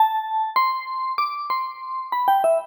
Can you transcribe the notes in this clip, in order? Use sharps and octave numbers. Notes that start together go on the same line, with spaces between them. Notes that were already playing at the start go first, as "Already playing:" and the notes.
Already playing: A5
C6
D6
C6
B5
G5
E5